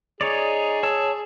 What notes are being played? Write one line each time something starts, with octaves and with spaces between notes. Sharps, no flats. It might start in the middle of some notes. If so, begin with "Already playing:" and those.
D#4 G#4 C#5 D5
C#5 A5 E6